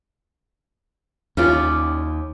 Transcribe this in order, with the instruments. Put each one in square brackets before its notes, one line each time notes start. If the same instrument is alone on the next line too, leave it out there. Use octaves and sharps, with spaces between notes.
[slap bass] D#2 [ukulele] C#4 F4 [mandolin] E4 G4 D5